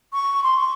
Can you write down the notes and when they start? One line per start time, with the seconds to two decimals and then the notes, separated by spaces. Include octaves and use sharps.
0.13 C#6
0.43 C6
0.57 C#6